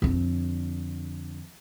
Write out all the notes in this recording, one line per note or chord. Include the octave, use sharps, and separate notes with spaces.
F2 D3